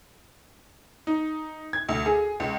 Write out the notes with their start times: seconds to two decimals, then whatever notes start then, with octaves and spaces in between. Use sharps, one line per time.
1.07 D#4
1.73 G#6
1.89 D2
2.06 G#4
2.40 C#2